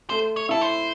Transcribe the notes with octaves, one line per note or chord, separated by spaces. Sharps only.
A3 C5
C#5
E4 A4
C5